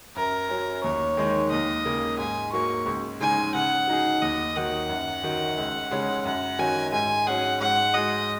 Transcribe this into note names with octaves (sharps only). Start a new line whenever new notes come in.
F#2 A#4
F#3 C#4
D#2 C#5
D#3 G#3 D#4
D#2 D#5
C#3 A#3
G#2 G#5
F#3 A#3 C#6
C#2
C#3 G#3 D#4 G#5
C#3 F#5
F#3 D#4 G#4
D#2 D#5
D#3 F#3 F#5
F#2
D#3 F#3
C#2
C#3 G#3 C#4
F#2 F#5
D#3 F#3 C#4 F#4 G#5
G#2 G#5
F#3 C#4 G#4 F#5
G#2 F#5
G#3 F#4 D#5